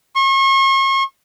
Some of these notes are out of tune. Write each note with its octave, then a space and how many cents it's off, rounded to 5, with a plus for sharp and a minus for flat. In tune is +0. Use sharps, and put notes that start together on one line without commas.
C#6 -40